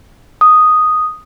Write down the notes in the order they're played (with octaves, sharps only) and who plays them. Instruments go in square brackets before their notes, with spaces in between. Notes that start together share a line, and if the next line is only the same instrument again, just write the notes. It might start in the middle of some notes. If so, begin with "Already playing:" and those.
[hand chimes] D#6